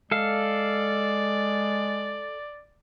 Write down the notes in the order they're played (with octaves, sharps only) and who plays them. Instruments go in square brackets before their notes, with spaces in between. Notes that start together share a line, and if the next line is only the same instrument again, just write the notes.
[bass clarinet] G#3 [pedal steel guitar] A4 F5 [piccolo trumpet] D5